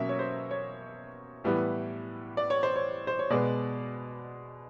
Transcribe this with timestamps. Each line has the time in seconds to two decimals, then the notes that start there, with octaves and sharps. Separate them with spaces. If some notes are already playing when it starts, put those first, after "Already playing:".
Already playing: B2 F#3 A#3 C#4 E5
0.09 C#5
0.19 C5
0.51 C#5
1.44 A2 E3 G3 B3
2.37 D5
2.50 C#5
2.63 C5
2.76 C#5
3.07 C5
3.19 C#5
3.30 B2 G#3 B3 D5